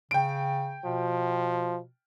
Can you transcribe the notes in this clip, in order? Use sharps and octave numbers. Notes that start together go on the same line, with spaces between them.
C#3 G5 D7
B2 F3